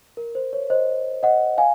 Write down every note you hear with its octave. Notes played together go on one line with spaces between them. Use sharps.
A#4
C5
C#5
C5 D#5
D#5 F#5
F5 G#5